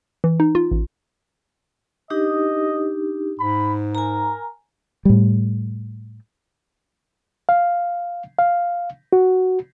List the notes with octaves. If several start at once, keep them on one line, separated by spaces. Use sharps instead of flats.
E3
D#4
F4
A1
D4 D#4 G4 D#5
G#2 B5
A#4 G#5 A#5
A2 G3
F5
F5
F#4